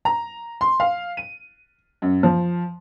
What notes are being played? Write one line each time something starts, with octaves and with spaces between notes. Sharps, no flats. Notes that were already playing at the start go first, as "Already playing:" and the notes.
A#5
C6
F5
D#7
F#2
F3